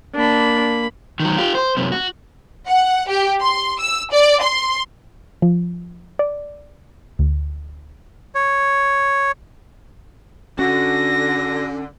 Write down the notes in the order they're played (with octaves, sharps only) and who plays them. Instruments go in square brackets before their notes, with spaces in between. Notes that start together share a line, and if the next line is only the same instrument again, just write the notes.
[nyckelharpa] A#3 B5 [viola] D4
[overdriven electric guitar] D#3 F#3
F4 G4
C5
F#2 C3
F#4
[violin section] F#5
G4
C6
E6
D5
C6
[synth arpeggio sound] F3
D5
D2
[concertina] C#5
[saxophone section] D3 [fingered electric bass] C#4 [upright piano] F#4 [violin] A#6